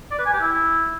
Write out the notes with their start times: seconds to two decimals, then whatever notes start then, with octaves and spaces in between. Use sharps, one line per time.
0.11 D5
0.18 B4
0.26 G#5
0.33 G4
0.41 E4